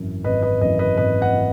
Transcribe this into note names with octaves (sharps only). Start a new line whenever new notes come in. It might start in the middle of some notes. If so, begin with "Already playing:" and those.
Already playing: G#1 F#2 E3
G#1 B4 D#5
B4 D#5
F#2 E3 B4 D#5
B4 D#5
G#1 B4 D#5
D#5 F#5
E3